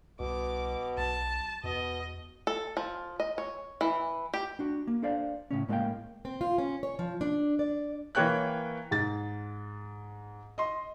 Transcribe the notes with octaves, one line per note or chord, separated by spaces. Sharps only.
C2 B2 D6
B1 A5
E2 B2 D#5
A4
F3
D#5
C#5
E3
G4
D4 F#4
A#3
D4 A4 C5 D5 F5
A2 C#3 C#4
A2 G#3 A#3 D5 F5 G5
C4
F4
C#4
C#5
F3
D4
D5
E3 A#3 C#5 G5 F#6
G#2 A6
D#5 C6